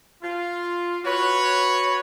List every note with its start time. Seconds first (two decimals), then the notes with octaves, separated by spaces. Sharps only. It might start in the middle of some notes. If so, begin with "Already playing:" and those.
0.23 F4
1.05 F#4 B4 C#5